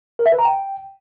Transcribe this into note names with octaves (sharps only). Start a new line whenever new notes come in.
A#4
E5
B4
A#5
G5